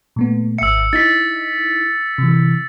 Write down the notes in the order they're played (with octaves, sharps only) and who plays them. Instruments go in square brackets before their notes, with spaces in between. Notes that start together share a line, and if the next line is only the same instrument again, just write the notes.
[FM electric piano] A#2 A3 B3
[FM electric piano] G#1 E5 [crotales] E6 C#7
[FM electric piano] D#4 E4 [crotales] A6 B6
[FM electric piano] C3 E3